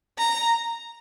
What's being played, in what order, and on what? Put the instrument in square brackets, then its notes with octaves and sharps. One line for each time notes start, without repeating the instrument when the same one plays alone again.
[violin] A#5